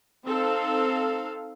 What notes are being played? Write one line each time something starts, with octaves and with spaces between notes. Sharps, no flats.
C4 D#4 A4 F5